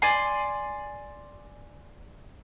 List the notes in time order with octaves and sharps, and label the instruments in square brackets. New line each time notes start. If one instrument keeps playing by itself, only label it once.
[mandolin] D5 G#5 C6